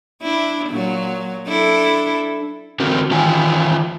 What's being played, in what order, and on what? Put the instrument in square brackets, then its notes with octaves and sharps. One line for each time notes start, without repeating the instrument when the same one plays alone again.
[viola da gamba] D4 E4
A#2 F#3
D4 E4 A4
[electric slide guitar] D3 C4 F#4 A#4
D#3 E3 F4 G5 G#5